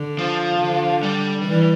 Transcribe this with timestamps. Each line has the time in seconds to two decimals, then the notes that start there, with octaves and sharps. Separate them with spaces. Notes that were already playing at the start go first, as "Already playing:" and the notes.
Already playing: D3
0.19 F3
0.61 D3
1.03 G3
1.45 E3